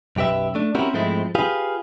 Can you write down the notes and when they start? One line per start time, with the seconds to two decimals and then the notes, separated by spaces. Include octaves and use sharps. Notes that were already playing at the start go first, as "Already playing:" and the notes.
0.16 B1 F#2 G4 B4 E5
0.55 A3 D4
0.75 C4 C#4 E4 F#4 G4 A#4
0.93 G#2 F3 G#3 A3 C4 E4
1.35 F4 G4 G#4 B4 F5